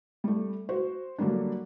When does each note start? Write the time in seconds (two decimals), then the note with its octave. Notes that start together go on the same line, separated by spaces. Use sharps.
0.24 G3 A3
0.69 F#4 C5
1.18 D3 F#3 G3 A#3 D4